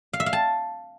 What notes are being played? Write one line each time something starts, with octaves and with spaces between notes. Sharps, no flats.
F5
E5
F5
A5